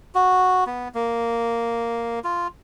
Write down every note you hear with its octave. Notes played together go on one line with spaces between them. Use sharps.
F#4
B3
A#3
F4